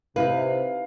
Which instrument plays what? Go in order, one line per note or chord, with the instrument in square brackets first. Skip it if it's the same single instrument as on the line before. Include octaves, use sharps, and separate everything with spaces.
[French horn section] C3 [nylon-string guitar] D#4 E4 B4 [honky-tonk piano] F5